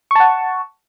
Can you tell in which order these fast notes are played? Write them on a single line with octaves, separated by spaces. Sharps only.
C#6 A5 F#5